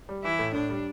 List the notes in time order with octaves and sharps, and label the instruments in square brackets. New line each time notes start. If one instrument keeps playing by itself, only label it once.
[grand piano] G3
[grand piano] E3 [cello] E4
[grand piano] A2
[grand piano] A2 [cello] D4
[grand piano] G3